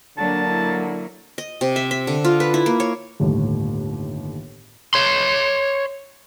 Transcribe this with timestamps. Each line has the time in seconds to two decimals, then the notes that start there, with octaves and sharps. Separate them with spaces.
0.18 D3 F#3 A#3 D4 A5
0.50 E4
1.38 D#5
1.61 C3
1.76 E5
1.91 E5
2.07 D3
2.25 F4
2.40 B4
2.54 E4
2.66 A#3
2.80 C#5
3.20 G1 D#2 A2
4.94 C#5 C6